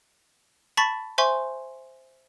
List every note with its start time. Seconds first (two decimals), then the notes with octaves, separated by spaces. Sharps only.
0.77 A5 B5 C#6 A6 B6
1.18 C5 E5 G#5 C6 C#6